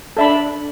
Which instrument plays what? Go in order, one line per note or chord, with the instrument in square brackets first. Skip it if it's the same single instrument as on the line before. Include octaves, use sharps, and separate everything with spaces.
[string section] D4 [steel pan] A4 E5 B5